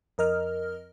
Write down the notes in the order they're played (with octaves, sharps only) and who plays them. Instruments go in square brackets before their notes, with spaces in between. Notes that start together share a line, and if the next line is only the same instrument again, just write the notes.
[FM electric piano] F2 A#4 D#5 F6